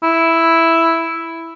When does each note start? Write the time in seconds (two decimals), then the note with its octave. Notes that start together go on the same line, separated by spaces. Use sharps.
0.03 E4